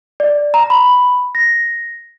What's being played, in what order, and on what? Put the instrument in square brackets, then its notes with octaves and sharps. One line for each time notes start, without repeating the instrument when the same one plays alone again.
[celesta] D5
A#5
B5
A#6